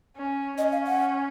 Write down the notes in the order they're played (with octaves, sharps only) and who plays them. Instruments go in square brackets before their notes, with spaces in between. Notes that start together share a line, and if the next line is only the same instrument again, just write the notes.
[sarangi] C#4
[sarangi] C#4 [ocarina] D#5
[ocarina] F5
F#5